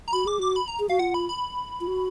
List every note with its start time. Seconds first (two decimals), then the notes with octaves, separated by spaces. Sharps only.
0.08 A#5
0.13 F#4 B5
0.26 G#4 D6
0.39 F#4 D6
0.56 B5
0.68 A#5
0.79 G#4
0.89 F#4 F5
0.99 F4 F#5
1.14 B5
1.29 B5
1.80 F4
1.87 F#4